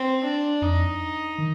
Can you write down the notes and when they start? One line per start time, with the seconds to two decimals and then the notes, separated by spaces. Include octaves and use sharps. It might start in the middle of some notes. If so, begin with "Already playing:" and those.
Already playing: C4
0.24 D4
0.62 F2 D#4
1.38 D#3